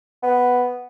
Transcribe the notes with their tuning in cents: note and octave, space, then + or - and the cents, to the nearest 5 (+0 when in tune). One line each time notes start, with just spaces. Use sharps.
B3 +0